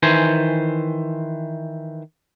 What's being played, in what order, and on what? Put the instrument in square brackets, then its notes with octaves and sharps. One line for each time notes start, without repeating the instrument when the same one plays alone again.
[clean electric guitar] D#3 E3 C5 G#5